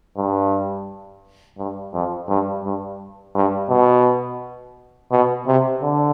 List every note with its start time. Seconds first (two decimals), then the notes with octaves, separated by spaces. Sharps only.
0.17 G2
1.58 G2
1.94 F2
2.28 G2
2.64 G2
3.35 G2
3.69 B2
5.12 B2
5.47 C3
5.82 D3